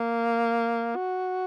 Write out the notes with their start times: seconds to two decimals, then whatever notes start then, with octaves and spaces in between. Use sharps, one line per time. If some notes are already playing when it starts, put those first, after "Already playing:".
Already playing: A#3
0.96 F#4